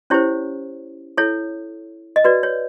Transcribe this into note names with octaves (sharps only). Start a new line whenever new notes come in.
C#4 E4 G4 C5 C#5
E4 A4 C#5
D#5
F#4 B4 D5
C#5